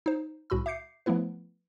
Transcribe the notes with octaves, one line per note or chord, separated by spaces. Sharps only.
D#4 C5
C2 A2 F#4 B5 E6
E5 D6 G6 C7 C#7
F3 A3 B3 E4 B4